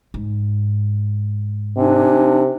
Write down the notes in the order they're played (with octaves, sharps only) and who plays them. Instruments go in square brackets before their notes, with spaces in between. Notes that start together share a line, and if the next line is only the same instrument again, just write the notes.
[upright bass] G#2
[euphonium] C3 [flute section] D4 D#4 G#5